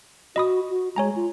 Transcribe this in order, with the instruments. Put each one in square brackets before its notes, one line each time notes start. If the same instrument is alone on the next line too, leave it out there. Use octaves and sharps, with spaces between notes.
[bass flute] F#4 [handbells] D#5 B5 D#6
[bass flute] F#4
[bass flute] G#3 [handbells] C#5 G#5 A#5
[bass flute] F4